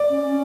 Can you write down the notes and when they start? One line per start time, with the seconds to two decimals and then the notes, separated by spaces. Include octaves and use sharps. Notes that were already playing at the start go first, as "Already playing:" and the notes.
Already playing: D5
0.09 C#4
0.27 C#4